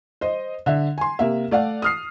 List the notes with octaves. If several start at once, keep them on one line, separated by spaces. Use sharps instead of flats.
C5 D#5
D3 E5
G#5 C6
C3 A#3 E5
A3 D5 F5 F#5
D#6 F6 C7